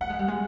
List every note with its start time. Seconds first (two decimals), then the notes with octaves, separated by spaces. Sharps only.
0.01 A3 F#5
0.10 G#3
0.19 G3
0.28 G#3